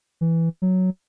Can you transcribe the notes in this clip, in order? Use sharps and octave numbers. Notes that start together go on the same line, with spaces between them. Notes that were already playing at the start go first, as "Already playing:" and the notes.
E3
F#3